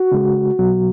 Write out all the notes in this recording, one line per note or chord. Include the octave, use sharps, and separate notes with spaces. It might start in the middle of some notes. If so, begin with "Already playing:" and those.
Already playing: F#4
C#3 G#3
B2 F#3